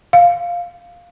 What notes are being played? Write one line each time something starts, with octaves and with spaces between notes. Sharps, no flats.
F5